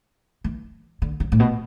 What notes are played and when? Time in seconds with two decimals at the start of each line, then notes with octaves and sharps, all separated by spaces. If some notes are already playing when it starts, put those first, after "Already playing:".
0.44 E3
1.02 D3
1.20 C#3
1.32 A2
1.40 B2